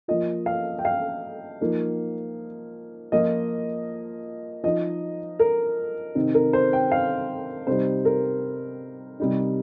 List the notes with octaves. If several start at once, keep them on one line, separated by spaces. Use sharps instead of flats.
F3 A#3 F4 D#5
F5
G5
F5
F3 A#3 D#4
F3 A#3 F4 D#5
F3 D#4 D#5
A#4
C3 D#3 C4 D#4
A#4
C5
G5
F5
C3 G3 D#4 C5
A#4
C3 G3 D#4